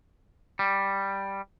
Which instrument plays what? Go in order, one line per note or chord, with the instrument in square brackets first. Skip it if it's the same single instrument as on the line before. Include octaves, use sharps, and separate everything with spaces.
[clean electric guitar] G3